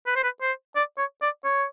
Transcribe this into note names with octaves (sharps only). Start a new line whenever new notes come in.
B4
C5
B4
C5
D5
C#5
D5
C#5